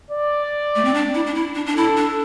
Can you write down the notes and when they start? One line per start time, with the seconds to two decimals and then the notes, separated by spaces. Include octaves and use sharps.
0.11 D5
0.76 A3
0.85 C4
0.94 D4
1.14 E4
1.26 D4
1.34 E4
1.55 D4
1.66 D4
1.76 E4 A4
1.97 D4